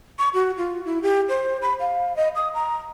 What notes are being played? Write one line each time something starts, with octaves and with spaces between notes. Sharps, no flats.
C#6
F#4
F4
E4
G4
C5
B5
F5
D#5
D#6
A#5